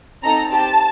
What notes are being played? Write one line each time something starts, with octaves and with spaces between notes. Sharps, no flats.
C4 D#4 A4 A#5
C4 G4 A5